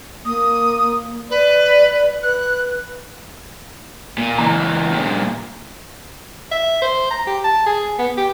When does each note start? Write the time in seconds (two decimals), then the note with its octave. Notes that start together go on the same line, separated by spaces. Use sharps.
0.25 A#3 D#6
1.30 B4 D5
2.22 B4 F#6
4.18 A#2
4.38 C#2 E3 A#5
4.93 G2 A#2
6.52 E5
6.82 C5
7.11 A#5
7.27 G4
7.44 A5
7.66 G#4
7.99 B3
8.17 G4